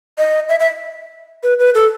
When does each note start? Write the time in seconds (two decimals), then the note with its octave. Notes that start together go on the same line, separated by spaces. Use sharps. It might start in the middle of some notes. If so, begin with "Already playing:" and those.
0.18 D#5
0.49 E5
0.60 E5
1.43 B4
1.59 B4
1.75 A4